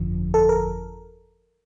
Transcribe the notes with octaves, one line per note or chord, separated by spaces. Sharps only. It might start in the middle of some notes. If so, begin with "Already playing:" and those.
Already playing: G1 F2 D3 F3
A4
A#4